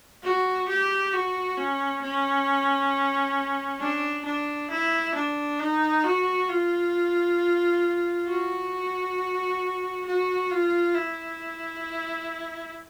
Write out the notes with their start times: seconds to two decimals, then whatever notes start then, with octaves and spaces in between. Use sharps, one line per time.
0.23 F#4
0.68 G4
1.13 F#4
1.57 C#4
2.02 C#4
3.80 D4
4.25 D4
4.70 E4
5.14 D4
5.59 D#4
6.04 F#4
6.48 F4
8.27 F#4
10.05 F#4
10.51 F4
10.94 E4